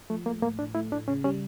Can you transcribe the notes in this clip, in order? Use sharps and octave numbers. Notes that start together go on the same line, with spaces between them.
F3 A3
A3 A#3
A2 A#3
A2 D4
A3 E4
A2 D4
C#3 C#4
G3 C#4